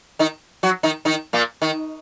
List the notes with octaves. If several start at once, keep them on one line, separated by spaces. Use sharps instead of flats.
D#3 D#4
F#3 F#4
D#3 D#4
D#3 D#4
A#2 A#3
D#3